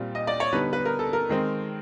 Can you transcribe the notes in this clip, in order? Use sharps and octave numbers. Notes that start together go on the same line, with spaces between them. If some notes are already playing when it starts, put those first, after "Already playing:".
Already playing: A#2 G3 C4 F4
D#5
D5
C#5
D3 G3 B3 D#4 B4
B4
A#4
A4
A#4
D#3 G#3 C4